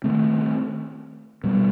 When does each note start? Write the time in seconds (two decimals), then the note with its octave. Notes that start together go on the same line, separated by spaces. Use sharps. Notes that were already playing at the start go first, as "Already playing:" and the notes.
0.04 D#3 A3 C4
1.44 B2 G3 B3